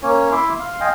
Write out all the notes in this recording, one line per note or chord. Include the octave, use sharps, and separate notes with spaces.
A#3 C#4 C#5
E4 E5 C6 D6
F5 C6
D#5 F5 G5 G#5